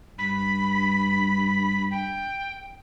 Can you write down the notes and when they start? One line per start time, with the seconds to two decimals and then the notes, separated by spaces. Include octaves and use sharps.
0.18 G2 B5
1.91 G5